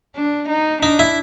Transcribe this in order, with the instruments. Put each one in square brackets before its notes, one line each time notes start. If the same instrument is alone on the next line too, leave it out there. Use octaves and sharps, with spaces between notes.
[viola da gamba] D4
D#4
[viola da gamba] D4 [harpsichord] D#4
[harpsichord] E4